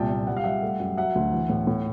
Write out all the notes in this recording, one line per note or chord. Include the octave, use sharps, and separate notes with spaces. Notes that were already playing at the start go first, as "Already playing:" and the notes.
Already playing: C2 A#2 G5 A5
A#2
G3 F#5
F5
G3 E5 F#5
A3
F#2
F#3 E5 F#5
D2
E3
A2
A2